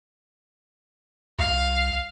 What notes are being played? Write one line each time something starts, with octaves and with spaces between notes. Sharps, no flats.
C2 F5